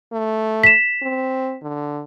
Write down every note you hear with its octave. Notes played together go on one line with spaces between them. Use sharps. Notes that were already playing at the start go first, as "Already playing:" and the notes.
A3
B6 E7
C4
D3